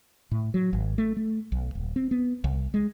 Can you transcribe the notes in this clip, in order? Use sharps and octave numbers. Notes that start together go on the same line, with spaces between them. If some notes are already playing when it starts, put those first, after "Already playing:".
A2
F#3
G#1
A3
A3
B1
D#1
C4
B3
C2
G#3